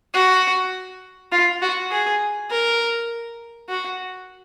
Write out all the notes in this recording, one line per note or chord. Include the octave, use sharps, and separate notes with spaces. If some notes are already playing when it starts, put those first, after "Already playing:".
F#4
F4
F#4
G#4
A#4
F#4